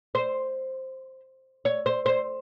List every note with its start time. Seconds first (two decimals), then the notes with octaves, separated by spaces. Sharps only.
0.15 C5
1.65 C#5
1.86 C5
2.06 C5